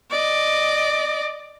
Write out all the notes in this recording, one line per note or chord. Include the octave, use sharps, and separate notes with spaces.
D5 D#5